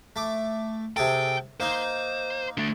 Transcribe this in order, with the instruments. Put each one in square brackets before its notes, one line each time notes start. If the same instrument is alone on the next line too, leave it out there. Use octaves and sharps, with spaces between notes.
[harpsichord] A3 D6
[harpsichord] C3 G#4 A4 [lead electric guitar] G5
[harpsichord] A#3 D#4 [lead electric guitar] C5
[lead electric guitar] D3 A3